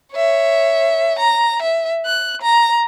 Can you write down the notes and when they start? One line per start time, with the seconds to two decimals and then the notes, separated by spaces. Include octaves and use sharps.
0.13 C#5 E5
1.19 A#5
1.62 E5
2.06 F#6
2.42 A#5